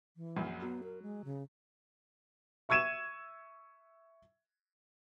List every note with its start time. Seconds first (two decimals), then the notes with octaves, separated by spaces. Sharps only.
0.16 E3
0.36 A#1 F#2 A#2
0.62 F#3 B3
0.83 A#4
1.02 G#3
1.25 C#3
2.69 E5 C#6 E6 G#6 D#7 E7